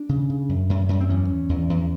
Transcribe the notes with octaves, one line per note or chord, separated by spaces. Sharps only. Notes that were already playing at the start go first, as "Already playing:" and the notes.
Already playing: D4
C#3
C#3
F#2
F#2
F#2
C4
E2 C#4
E2
E2
E2